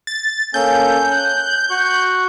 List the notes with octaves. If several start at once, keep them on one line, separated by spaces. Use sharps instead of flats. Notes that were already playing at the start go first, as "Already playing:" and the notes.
A6
A#3 C#4 A4 G6
F#6
F#4 C#6 F#6